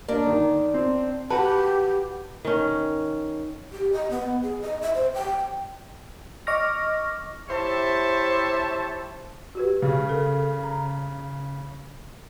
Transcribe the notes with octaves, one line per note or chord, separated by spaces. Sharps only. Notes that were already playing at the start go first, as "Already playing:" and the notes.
A#3 D4
D#3
C4
F#4 G4 B4 A5
D#3 C#4
G4
D#5
B3
G#4
D#5
E5
C5
G5
D#5 C#6 D6 F6 A#6
E4 G4 C5 C#5 E5 A5
F#4 G4 B4
C#3 G#4
A4 A#4
A#5